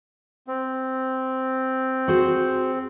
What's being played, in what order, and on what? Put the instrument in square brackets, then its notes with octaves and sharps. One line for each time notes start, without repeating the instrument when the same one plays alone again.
[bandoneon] C4
[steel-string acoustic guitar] F#4 G#4 C5